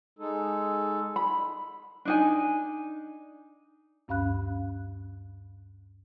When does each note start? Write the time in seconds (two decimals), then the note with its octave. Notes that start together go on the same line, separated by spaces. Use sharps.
0.19 G#3 D#4 A4
1.16 B5
2.05 D4 D#4 G#5
4.08 D2 G2 C#4 F5 B5 F#6